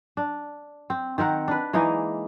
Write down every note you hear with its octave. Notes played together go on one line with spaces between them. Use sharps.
D4
C4
D#3 C4 A#4 F#5
D4 B4
E3 G#3 A#3 D#4